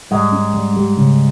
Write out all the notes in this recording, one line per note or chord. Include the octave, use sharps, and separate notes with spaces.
G#2 G3 G#3
C#4
G3
G3
C#3